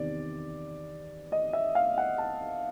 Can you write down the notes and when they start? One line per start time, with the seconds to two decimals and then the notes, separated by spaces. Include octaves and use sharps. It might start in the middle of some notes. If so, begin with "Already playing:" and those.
Already playing: E2 C3 D#3 D5
1.32 D#5
1.53 E5
1.75 F5
1.98 F#5
2.18 A5